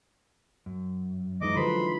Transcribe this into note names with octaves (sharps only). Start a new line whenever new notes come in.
F#2
E3 G#3 D#4 D#5 D6
D3 F3 F#3 B4 C5 B5 C6